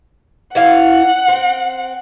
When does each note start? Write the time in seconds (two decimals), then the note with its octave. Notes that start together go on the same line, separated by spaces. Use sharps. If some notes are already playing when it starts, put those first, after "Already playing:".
0.55 E3 E4 F5 F#5
1.28 C4